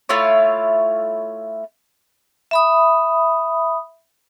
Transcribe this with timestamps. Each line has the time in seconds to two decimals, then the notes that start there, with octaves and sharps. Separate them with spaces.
0.09 A3 E4 F4 C#5
2.51 E5 B5 D#6